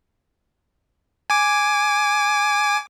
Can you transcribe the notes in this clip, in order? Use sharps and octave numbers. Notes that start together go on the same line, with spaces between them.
G#5 D6